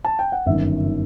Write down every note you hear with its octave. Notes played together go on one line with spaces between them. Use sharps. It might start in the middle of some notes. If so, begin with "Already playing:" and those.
A5
G5
F#5
G1 F#2 D#3 E5
D#3